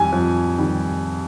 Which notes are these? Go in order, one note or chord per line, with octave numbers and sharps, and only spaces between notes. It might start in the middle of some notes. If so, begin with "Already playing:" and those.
Already playing: F2 D#3 G3 G#5
F2
D#3 G3